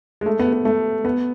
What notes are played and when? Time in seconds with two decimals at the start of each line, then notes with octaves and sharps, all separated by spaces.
0.21 G#3
0.26 A3
0.39 B3
0.53 B3
0.65 A3
1.05 B3